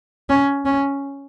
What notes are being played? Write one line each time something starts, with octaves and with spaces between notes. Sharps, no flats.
C#4
C#4